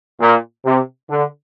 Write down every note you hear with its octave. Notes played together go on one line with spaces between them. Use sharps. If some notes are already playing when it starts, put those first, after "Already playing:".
A#2
C3
D3